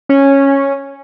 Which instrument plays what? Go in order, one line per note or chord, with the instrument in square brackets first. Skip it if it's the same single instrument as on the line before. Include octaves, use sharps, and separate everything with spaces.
[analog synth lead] C#4